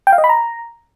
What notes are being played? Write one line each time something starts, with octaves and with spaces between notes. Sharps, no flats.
G5
F5
D#5
B5
A#5